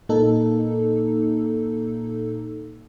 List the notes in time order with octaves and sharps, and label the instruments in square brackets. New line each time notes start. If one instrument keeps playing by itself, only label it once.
[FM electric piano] A#2 A#3 D#4 A4